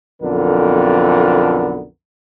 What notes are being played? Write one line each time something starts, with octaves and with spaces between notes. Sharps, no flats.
B1 F2 D3 B3 A#4